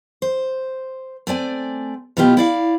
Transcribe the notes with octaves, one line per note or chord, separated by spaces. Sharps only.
C5
A3 C4 D5 G#5
B2 A3 B3 E4 F4 G4
E4 D5 F5